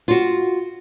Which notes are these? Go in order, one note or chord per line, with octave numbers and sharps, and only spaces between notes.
F4 F#4